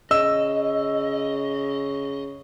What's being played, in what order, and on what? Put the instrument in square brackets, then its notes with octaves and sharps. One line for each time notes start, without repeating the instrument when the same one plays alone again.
[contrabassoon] C#3 [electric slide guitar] D#5 [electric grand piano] E6